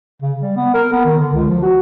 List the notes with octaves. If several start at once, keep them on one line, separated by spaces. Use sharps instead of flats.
C#3
G3
B3
A#4
B3
D#3
D3
C#2
F3
F#4